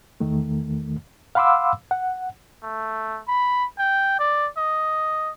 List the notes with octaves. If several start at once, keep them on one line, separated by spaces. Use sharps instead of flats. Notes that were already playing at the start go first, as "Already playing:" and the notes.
E2 D#3 A3
F5 F#5 B5 C6 D6 E6
F#5
A3
B5
G5
D5
D#5